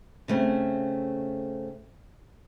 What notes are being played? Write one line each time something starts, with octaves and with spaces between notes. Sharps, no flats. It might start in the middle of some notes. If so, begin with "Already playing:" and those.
C#3 A3 C4